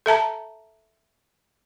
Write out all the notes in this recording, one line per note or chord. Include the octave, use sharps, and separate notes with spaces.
A4 E5 A5 A#5